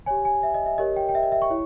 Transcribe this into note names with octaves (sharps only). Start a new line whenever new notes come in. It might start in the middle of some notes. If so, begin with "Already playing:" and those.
G4 C#5 G#5
G#5
E5
D#5
E5
G4 A#4 C#5 D#5
G5
G5
E5
D#5
E5
C#6
E4 C#5